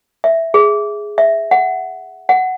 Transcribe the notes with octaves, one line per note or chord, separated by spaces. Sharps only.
E5
G#4
E5
F#5
F#5